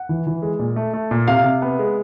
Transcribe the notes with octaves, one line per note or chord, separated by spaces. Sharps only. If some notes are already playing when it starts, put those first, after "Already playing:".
Already playing: F#5
E3
E3
G#3
A#2
A3
A3
A#2
C3 F5
C3
B3
G#3